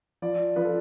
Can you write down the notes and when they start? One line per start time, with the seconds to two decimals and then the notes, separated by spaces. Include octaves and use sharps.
0.22 F3 D5
0.56 F3 B4
0.65 A4